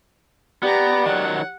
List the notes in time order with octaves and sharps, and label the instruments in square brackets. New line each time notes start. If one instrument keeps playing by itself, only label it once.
[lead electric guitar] B3 [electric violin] G4 A#5 [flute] D5
[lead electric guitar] D#3 F#3 [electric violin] F#5